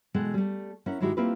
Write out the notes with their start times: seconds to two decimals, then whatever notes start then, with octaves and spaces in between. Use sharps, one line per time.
0.14 B2 E3 G#3 A4 F#5 G5
0.34 G3 A3
0.86 C#4 E4 A#4 F#5
1.00 G#2 D#3 G#3 E4 F#4 G4
1.17 A#3 C4 E4 F4 G4 B4